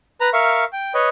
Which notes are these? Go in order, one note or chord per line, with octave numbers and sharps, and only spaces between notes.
B4 A#5
A#4 E5 F5 C#6
G5
B4 C#5 D#5